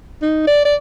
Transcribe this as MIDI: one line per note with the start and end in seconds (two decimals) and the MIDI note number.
0.22 0.46 63
0.47 0.63 74
0.65 0.75 74